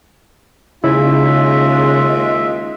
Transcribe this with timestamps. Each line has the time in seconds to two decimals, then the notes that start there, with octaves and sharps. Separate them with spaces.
0.84 D#2 C#3 G#3 E4 F4 E5